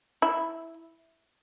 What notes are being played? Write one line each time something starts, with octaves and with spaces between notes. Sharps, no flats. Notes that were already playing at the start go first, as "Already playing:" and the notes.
E4